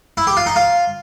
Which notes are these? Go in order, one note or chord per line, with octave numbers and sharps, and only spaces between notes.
E4
G4
F4
D#4
F4